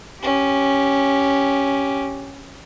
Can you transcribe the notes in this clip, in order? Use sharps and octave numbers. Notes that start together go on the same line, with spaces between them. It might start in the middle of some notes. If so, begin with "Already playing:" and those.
C#4 G4